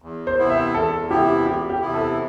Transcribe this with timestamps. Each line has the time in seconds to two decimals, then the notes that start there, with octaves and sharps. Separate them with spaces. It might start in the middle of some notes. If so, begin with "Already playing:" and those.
0.02 E2
0.27 C5
0.38 C3 E3 B3 E4
0.50 E5
0.74 E2 A4
1.10 C3 E3 B3 E4 G4
1.46 E2 G4
1.69 G4
1.82 C3 E3 B3 E4
1.94 A4